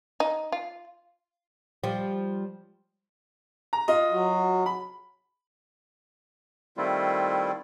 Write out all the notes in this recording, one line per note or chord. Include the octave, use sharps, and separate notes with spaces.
D#4
F4
F3 G3
A#5
F4 D#5
F#3 F#4
B5
D#3 G3 A3 C4 E4 F4